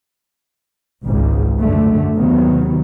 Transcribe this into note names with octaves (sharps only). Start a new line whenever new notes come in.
G#1 C#2 G#2
F#2 D3 A3
D#2 C3 D#3 F#3 B3